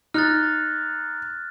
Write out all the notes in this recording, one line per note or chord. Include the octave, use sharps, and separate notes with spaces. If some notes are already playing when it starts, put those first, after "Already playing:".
D#4 F6 F#6 A6